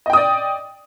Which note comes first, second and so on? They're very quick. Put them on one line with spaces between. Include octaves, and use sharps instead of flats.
D#5 G5 D#6 D5